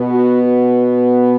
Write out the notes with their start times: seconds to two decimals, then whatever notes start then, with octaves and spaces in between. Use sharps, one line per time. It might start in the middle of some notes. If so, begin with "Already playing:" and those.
Already playing: B2 B3
0.10 F#4